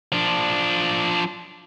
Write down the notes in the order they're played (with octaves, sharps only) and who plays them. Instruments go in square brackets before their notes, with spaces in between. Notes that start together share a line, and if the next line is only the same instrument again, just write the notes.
[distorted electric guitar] F3 D4